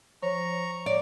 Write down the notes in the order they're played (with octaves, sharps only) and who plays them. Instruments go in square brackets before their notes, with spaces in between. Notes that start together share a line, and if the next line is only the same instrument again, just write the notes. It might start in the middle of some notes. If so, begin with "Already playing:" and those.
[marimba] F3 C5 C#5 [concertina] A#5 C#6
[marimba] C#5 [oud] D5